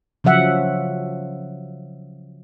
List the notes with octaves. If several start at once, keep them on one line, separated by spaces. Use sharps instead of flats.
C#3 F3 F#3 E5 F#5